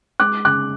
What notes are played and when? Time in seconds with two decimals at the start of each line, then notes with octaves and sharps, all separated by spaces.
0.20 G#3 D6 F#6
0.45 C#3 D6 F#6